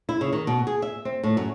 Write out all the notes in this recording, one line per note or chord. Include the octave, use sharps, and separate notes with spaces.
E4
C#3
D#3
B2
G#4
E5
C4
A2
F#2